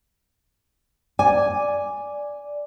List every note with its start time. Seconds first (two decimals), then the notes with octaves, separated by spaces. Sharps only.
1.19 D5 G#5